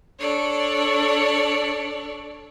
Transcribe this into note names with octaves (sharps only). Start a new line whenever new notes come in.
D4 A4 C#5 D5